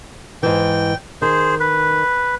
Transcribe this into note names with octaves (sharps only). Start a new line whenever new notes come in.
G#2 E3 G5
D#3 G#4 C5
B4